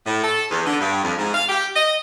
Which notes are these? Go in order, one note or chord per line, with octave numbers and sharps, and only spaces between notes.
A2
A4
E2
D3
G2
F2
G#2
F5
G4
D#5